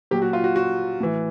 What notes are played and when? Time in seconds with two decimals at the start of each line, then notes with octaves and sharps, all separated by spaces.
0.11 A#2 F#3 G4
0.22 F#4
0.33 F4
0.44 F#4
0.56 F#4
1.00 A2 E3